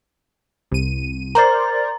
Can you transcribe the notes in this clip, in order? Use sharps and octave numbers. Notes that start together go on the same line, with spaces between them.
C2 D#7
A#4 C5 D5 A#5 A6